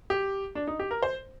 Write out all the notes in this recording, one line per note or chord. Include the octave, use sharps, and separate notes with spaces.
G4
D4
D#4
G4
A#4
C5